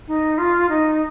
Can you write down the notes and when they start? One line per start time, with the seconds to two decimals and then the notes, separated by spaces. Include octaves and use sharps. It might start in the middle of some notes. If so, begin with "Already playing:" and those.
0.07 D#4
0.38 F4
0.69 D#4